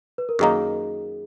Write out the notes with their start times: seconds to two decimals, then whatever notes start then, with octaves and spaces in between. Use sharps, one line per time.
0.18 B4
0.29 A#4
0.39 F#2 D#3 A#3 D#4 G#4